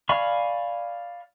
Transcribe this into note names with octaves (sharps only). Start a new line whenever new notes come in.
D5 F5 G#5 B5 C#6